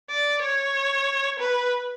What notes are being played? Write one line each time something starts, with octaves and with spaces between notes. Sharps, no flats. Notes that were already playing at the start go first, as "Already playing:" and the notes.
D5
C#5
B4